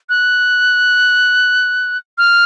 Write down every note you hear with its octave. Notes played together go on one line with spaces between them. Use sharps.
F#6
F6